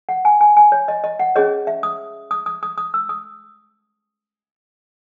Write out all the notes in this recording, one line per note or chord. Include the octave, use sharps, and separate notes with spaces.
F#5
G#5
G#5
G#5
C#5
D#5
D#5
F#5
C#4 G#4 C#5 D#5
E5
D#6
D#6
D#6
D#6
D#6
E6
D#6